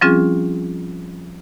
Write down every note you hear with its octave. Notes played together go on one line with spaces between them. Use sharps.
F3 G3 C4 C#4 F4 G#4